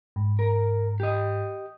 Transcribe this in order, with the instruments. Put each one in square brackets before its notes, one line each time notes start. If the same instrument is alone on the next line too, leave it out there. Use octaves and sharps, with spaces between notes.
[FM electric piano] G#2
[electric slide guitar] A#4
G4 D#5